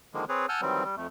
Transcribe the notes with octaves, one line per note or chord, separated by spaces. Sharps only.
D3 D#3 F3 G#3 A#3
C4 G#4 B4 C#5
F#5 G#5 A5 E6 F6 G6
D#3 E3 F#3 G3 C4
G3
F2 A3